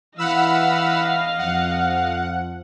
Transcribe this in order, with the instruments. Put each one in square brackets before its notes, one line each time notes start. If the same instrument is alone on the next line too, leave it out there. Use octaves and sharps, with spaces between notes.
[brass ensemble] E3 [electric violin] D#5 F5 [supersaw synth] F#5 B5 E6
[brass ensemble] F2 F3 [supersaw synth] F#5